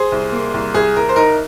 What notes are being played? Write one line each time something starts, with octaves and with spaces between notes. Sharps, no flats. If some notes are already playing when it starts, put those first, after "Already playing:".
Already playing: G#4 C5
C2
A#3
C2
C2 G#4
C2 A#4
C5
D#4 A#4